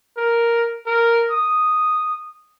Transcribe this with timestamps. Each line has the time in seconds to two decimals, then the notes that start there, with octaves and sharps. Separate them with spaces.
0.17 A#4
0.87 A#4
1.31 D#6